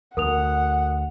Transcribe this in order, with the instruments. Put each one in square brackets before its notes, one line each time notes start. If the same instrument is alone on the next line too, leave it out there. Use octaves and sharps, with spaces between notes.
[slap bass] D2 [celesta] A#4 D#6 F7 [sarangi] F#5